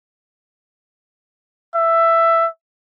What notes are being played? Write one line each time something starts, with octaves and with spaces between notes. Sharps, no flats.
E5